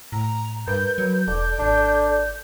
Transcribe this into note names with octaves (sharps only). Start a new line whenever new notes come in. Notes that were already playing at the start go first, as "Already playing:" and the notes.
A2 A#5
G2 A#4 B4 G6
F#3 G6
E1 A4 D5
G#1 D4